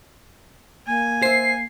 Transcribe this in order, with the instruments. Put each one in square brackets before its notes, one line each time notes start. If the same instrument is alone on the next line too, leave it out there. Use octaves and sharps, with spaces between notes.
[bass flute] A#3 [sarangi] G#5
[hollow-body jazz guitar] C5 E5 [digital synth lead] C7